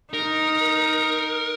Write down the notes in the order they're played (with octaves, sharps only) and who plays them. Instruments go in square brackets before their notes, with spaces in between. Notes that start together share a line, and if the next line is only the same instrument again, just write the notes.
[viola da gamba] D#4 [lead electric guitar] A#4